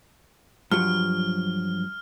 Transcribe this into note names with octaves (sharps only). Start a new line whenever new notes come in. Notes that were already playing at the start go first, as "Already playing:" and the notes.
G2 F3 F#3 F6